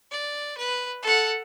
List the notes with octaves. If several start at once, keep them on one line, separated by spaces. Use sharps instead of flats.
D5
B4
A4 F#5